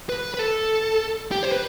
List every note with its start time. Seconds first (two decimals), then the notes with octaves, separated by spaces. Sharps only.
0.09 B4
0.34 B4
0.39 A4
1.31 G4
1.43 C5
1.52 B4